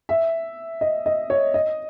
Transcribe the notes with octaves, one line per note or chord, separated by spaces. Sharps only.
E5
D#5
D#5
C#5
D#5